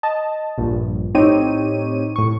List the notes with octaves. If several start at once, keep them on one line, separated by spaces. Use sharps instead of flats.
D#5 A5
A#1 G2
A2 C4 D#4 G4 C#5 D#7
A2 C#6